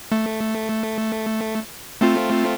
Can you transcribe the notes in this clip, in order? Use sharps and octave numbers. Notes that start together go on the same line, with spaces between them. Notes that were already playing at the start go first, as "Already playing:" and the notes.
A3
A3 C4 F4